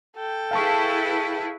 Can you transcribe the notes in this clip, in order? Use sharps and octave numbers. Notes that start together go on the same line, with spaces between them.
A4 G5
E4 G#4 B4 F5 A5 C#6